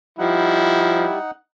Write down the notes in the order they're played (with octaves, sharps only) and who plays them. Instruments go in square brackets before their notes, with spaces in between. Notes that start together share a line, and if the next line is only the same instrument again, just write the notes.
[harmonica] F3 [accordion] G3 [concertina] D#4 F#5 [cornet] E4